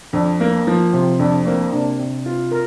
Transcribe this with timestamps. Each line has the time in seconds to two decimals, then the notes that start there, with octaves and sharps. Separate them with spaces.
0.13 F2 D4
0.40 A#3
0.67 F3
0.93 C3 C4
1.19 F2 D4
1.46 A#3 C4
1.73 C3 D4
2.00 C3
2.26 F4
2.52 A#4